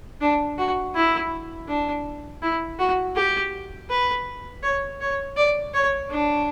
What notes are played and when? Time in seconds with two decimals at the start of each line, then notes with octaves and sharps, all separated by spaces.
0.21 D4
0.58 F#4
0.95 E4
1.68 D4
2.42 E4
2.79 F#4
3.16 G4
3.90 B4
4.63 C#5
5.01 C#5
5.37 D5
5.74 C#5
6.11 D4